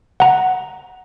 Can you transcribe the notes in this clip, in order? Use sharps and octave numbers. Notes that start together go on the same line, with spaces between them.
F#5 A#5